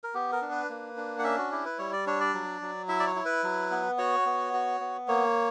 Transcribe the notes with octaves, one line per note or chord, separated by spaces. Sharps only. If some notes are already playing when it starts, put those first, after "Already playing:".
A#4
B3 G4
A#4
D4
B4
A#3
D4
F#5
C#4 E5
F#4
E4 G4
B4
G3 C#5
D5
D4 C#5
D5
F#3
F#3
E4 E5
D5
C#5
E4
B4
F#3
B3
F#4 C#5
B3
F#4
B3
A#3 C#5